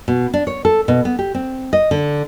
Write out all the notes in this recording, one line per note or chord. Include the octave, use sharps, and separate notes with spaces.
B2
D4
C#5
A4
B2
B3
G4
C4
D#5
D3